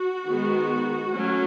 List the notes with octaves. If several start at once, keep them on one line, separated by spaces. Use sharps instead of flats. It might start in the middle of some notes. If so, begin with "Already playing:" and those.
Already playing: F#4
D#3 G#3 B3
F#3 A3 C#4